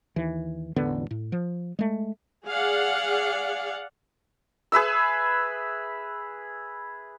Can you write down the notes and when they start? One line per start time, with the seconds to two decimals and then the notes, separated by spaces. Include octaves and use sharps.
0.16 D#2 E3
0.76 E1 A1 D3 B3
1.11 A2
1.32 F3
1.79 G#3 A3
2.46 G#4 D5 F5 F#5
4.72 G#4 B4 E5 E6